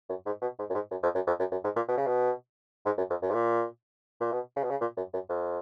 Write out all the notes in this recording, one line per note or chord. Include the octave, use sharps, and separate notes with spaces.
F#2
G#2
B2
G#2
F#2
G#2
F#2
F2
F#2
F2
F#2
F#2
G#2
A#2
B2
C#3
B2
G#2
F#2
F2
F#2
G#2
A#2
A#2
B2
C#3
B2
C#3
A#2
F#2
F#2
F2